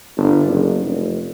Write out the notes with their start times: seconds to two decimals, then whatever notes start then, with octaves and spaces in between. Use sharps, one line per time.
0.17 G1
0.48 F#1
0.86 F1